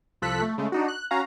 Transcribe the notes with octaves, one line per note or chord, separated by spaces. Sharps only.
C2 F3 A4 F#6 B6
A3
C#3 G#3 A3
D4 D#4 F#4
F#6
C#4 F#4 F5 A#5